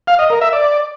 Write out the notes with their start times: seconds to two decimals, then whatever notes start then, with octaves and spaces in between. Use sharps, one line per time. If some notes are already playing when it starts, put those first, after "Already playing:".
0.07 F5
0.19 D#5
0.30 A#4
0.41 E5
0.53 D5